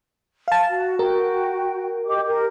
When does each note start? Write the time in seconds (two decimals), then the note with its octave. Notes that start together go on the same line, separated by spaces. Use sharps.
0.48 F5 A5
0.70 F#4
0.99 F#4 A#4 G5
2.06 G4 D#5 D6
2.26 G4 A#4